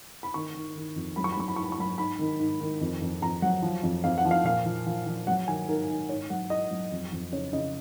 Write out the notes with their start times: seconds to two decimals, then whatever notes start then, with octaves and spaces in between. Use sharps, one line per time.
0.23 B5
0.34 D#3 C#6
0.55 D#3
0.75 D#3
0.96 F2
1.16 F#3 B5
1.24 C#6
1.32 B5
1.37 F#3 C#6
1.48 B5
1.56 G#2 C#6
1.64 B5
1.72 C#6
1.78 F#3 B5
1.98 G#2 B5
2.19 D#3
2.39 G#2
2.61 D#3
2.81 F2
3.02 F2
3.22 F2 A#5
3.42 F#3 F#5
3.62 F3
3.83 F2
4.04 F2 F5
4.18 F#5
4.25 F3
4.31 F5
4.44 A#2 F5
4.66 F3
4.86 F3
5.06 F3
5.27 F#3 F#5
5.47 D#3 G#5
5.68 G#2 A#4
5.88 D#3
6.09 G#2 C#5
6.30 F#3 F#5
6.50 G#2 D#5
6.71 F#3
6.91 F2
7.12 F2
7.32 C#3 C#5
7.53 C#3 D#5